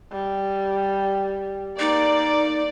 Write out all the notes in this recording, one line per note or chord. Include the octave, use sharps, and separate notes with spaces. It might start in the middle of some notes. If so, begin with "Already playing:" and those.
G3
A#3 D#4 D5